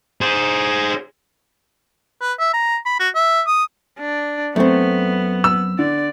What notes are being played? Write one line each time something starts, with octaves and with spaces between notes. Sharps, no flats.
G#4 C5
B4
E5
A#5
B5
F#4
E5
D#6
D4
F#2 A3 B3 C4
E6
D3 D5